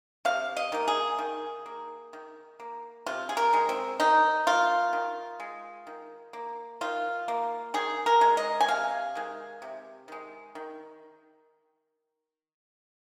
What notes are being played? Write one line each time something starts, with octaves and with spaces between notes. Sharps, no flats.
C3 F5
D#5
D#3 A#3
G#4
D#3
A#3
D#3
A#3
C3 F4
G#4
A#4
D#3 G#3
C4
D#3 D#4
A#3 F4
D#3
G#3
D#3
A#3
D#3 F4
A#3
D#3 G#4
A#4
G#3
D#5
G#5
C3 F5
D#3 G#3
C3
D#3 G#3
D#3